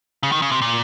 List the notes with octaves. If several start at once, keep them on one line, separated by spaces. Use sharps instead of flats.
C#3
D#3
C#3
C3
A#2